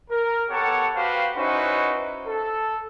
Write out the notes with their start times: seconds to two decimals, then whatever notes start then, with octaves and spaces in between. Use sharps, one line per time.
0.11 A#4
0.50 B3 G4 A4 C#5 F#5 A5
0.95 F#4 G4 B4 C5 F5
1.37 C#4 D#4 E4 F#4 B4 C5
2.28 A4